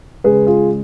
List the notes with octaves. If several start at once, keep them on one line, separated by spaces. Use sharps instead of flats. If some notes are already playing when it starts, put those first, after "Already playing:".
C#3 G#3 G#4 B4
F4 G#4